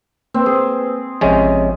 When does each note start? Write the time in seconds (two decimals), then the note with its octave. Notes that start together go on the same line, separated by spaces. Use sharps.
0.34 A#3 C4 B4
0.46 G#4
1.21 A1 C3 F3 G#3 C#4